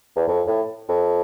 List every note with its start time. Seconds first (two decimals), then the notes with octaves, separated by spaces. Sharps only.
0.16 E2
0.28 F2
0.47 A2
0.89 F2